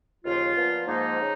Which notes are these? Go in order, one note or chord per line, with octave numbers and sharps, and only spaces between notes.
D#2 C#3 F3 F4
A#2 F3 B3
G#2 F3 A#3 D#4
C#3